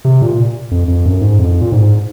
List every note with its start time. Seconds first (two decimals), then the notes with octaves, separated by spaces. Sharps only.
0.05 C3
0.22 A#2
0.71 F2
0.88 F2
1.05 F#2
1.22 G#2
1.39 F2
1.61 A#2
1.72 G#2